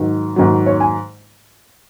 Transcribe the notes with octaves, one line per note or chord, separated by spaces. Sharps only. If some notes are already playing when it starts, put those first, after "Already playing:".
Already playing: G#2 D#3 F#3
G#2 D#3 F#3
C#5
G#5